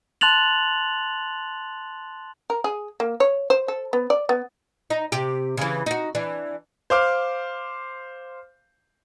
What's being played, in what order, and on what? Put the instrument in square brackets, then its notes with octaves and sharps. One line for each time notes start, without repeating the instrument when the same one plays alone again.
[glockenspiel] A5 C6 F#6 A6 F7 F#7
[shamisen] A#4
G#4
A#3
C#5
C5
A4
B3
D5
B3
[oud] D#4
C3 G4
C#3 E3
D#4 F#4
E3 D4
[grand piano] C5 F5 D6 F6